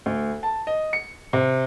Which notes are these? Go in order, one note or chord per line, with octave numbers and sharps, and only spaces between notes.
D2
A5
D#5
C#7
C3